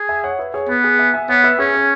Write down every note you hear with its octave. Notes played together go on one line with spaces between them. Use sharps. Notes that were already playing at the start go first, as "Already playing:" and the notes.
Already playing: G#4
E5 G#5
C#5 F#5
B4 E5
G#4 C#5
B3 B4
G#4
E5 G#5
E5 G#5
B3 C#5 F#5
B4 E5
C#4 G#4 C#5
G#4